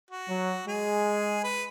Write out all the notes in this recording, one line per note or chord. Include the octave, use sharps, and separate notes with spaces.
F#4
F#3
G#3 G#4
B4